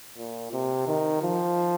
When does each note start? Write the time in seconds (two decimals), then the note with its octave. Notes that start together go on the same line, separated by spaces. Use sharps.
0.17 A#2
0.52 C3
0.87 D#3
1.23 F3